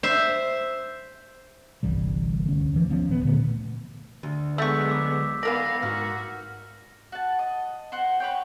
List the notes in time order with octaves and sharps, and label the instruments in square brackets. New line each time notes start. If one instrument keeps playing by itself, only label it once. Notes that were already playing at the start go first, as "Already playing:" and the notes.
[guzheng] C5 E5
[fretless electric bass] G1 C2 E3 G3
D2 C#4
E3 F3
D#3 F3 B3 C#4
D1 B3
A#2 D3 A3 B3
[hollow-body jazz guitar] D2
[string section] F#3 G#3 B3 [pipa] A3 C#6 [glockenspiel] E6 G6 B6
[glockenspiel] D6
[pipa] E3 A#4 D5 [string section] B3 F5 [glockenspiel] A#6
[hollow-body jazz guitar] G#2 [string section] F#4 [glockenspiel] F6
[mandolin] F#4 A5
D#5
F#4 C5
B4 C#5 G5